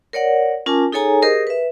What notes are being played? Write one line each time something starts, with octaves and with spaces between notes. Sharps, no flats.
A#4 C#5 D5 F#5
C#4 F4 A#4 G#5 A5 D6
D#4 G#4 A4 C#5 G#5 A#5
G4 G#4 A#4 C5 D#5 D#6
B4 E5